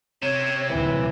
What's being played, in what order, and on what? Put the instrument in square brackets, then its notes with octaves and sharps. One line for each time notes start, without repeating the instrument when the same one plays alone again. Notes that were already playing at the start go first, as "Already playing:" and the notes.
[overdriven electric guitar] C3 [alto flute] C#5
[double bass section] D2 A#2 F#3 [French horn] E3 [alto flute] C#5